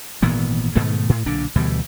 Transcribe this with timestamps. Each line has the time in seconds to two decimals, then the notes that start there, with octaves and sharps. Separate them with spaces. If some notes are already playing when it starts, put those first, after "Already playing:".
0.22 G#1 A#2 E3 B3
0.75 G#2 B2 D#3 A3
1.09 A2
1.26 B1 A#2 D3 D4
1.56 D2 B2 E3 G3